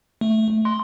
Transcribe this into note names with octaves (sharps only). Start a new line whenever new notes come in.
A3
C6